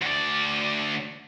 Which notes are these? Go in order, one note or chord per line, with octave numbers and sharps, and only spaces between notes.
D2 D5